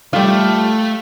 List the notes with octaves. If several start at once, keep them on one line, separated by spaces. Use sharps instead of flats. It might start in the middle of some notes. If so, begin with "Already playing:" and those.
G3 A3 F4